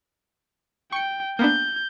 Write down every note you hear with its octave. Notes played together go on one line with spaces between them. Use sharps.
G5 C#6 C#7
A#3 B3 D4 G6